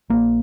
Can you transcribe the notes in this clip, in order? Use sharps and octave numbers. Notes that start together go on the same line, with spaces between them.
A#1 A#2 A#3